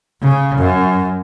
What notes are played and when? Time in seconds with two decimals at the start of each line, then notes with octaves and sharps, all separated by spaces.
0.22 C#3
0.58 F#2